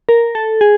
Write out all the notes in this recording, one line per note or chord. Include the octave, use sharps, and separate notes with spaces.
A#4
A4
G#4